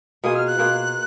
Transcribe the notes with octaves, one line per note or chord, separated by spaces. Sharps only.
B2 A#3 F4 G#4 D#6
F6
F#6
B2 A#3 F4 G#4